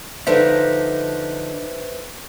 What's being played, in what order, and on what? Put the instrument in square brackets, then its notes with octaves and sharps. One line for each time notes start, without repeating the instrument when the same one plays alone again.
[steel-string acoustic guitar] D3 F3 D#4 [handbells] B4 C5 E5